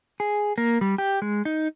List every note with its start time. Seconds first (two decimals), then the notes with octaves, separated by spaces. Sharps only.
0.20 G#4
0.58 A#3
0.81 G3
0.98 G4
1.22 G#3
1.45 D#4